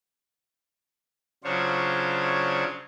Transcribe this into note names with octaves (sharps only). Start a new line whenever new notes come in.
C#3 F#3 D4 F4 C5 C#5